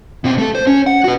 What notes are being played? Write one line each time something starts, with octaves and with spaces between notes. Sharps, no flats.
B2 C4
A3 A4
C5
C#4
F#5
F#4 B4